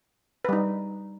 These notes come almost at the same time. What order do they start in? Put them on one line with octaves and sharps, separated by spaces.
B4 G3 D#4